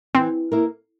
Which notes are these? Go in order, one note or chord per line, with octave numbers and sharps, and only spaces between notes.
E3 C4
A#3 E4 A#4